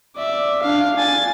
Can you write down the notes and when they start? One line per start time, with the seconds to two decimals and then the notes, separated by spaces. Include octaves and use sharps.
0.16 D5 E5
0.62 D4 F5
0.97 G#5 A6